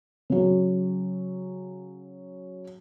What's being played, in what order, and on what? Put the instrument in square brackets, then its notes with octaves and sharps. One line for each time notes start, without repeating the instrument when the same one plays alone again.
[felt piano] C#3 F#3